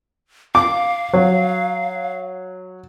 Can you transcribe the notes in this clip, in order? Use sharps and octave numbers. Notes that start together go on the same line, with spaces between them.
F5 D6
F#3